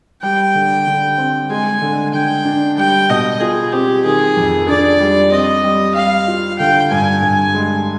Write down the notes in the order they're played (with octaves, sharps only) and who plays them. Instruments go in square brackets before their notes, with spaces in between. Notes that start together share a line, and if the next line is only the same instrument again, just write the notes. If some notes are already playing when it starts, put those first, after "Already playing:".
[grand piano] G3 [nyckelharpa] G5
[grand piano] D3
D3
C4
[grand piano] G#3 [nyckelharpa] G#5
[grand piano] D3
[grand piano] D3 [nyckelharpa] G5
[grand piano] D4
[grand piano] G3 [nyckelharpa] G5
[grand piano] B2 [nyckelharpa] D#5
[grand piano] F4 [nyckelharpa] G#4
[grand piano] C4 [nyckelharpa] G4
[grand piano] D#3 [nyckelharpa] G#4
[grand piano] F2
[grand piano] D4 [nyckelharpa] D5
[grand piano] G3
[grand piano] C4 [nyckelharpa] D#5
[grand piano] G3
[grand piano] G3 [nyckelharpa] F5
[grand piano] F4
[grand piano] D3 [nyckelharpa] G5
[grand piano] G2 [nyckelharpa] G#5
[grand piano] G2
G#3